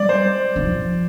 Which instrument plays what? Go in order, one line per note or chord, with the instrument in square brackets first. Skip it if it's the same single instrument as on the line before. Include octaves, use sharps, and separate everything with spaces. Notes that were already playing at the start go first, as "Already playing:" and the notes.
Already playing: [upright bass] G3 [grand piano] D5
[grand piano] C5
[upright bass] D3
F3